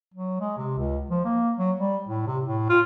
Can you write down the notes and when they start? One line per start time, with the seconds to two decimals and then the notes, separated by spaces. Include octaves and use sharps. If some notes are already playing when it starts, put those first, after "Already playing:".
0.14 F#3
0.40 G#3
0.58 C3
0.78 C#2
1.10 F3
1.24 A#3
1.57 F#3
1.79 G3
2.08 A2
2.27 C3
2.45 A2
2.69 F4